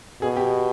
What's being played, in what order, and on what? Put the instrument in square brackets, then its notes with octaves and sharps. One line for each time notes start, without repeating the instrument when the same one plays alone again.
[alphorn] B2 [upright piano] G#4
[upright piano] G4